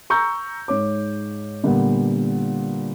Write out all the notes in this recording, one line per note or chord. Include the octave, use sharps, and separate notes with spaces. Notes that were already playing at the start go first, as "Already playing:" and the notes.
A#5 C#6 E6 G6
G#2 C#5 D6
A#2 D3 G3 B3